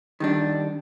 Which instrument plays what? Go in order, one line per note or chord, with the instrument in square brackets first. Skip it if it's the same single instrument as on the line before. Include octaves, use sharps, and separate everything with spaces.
[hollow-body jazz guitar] D#3 G3 D4